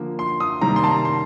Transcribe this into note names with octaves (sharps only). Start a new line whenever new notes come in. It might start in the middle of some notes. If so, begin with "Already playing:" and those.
Already playing: D3 F3 A#3
C6
D#6
C3 D#3 G3 A#3 A#5
C6
A5
A#5
C6